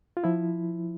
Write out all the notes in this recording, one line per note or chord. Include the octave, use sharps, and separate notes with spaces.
F4
F3 E4